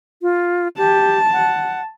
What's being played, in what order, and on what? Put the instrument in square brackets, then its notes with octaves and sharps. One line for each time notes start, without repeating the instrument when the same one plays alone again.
[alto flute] F4
[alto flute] G4 [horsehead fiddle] A5
[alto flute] F#5